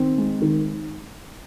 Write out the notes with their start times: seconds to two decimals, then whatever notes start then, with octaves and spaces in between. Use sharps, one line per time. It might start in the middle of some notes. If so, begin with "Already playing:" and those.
Already playing: D#3 C4
0.18 G#3
0.41 D#3